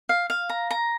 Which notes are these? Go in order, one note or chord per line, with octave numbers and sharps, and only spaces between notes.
F5
F5
A#5
A#5